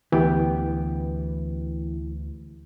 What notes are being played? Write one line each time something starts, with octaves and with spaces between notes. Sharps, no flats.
D2 E3 B3 G4